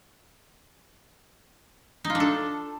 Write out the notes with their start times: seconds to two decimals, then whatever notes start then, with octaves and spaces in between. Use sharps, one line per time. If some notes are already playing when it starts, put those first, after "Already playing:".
2.04 D#4
2.10 F4
2.15 D4
2.20 A4